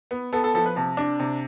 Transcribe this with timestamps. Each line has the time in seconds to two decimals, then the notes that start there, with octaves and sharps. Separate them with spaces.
0.11 B3
0.33 B3 A4
0.44 A4
0.54 F3 A4
0.66 B4
0.76 C3 A5
0.97 D4
1.20 C3